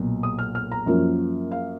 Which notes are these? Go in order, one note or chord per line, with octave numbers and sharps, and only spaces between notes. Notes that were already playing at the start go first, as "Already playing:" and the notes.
Already playing: B1 A#2 F#3
D#6
F6
F6
A#5
F#2 F3 A#3 C#4 F4
F5